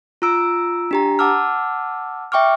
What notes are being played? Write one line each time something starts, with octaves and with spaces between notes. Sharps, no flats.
F4 A#5 E6 D7
D4 G4 A#5
F#5 A5 D6 E6 F6
E5 G5 C#6 D6 F6